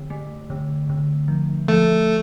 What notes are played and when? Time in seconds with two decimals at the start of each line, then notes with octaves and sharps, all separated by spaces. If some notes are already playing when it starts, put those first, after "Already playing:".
Already playing: D3
0.10 A3
0.50 D3
0.89 D3
1.28 F3
1.68 F3 A3